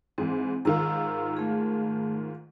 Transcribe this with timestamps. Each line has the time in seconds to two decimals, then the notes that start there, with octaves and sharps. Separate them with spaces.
0.18 G#2 E3 C4
0.65 G#2 D#3 F4 A#5 E6
1.37 A3 G#4